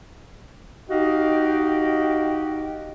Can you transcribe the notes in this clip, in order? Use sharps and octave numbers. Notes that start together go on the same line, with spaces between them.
D#4 F#4 G4 D#5 F5 G5